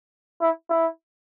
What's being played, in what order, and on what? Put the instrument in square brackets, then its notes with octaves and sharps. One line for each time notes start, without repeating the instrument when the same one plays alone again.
[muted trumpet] E4
E4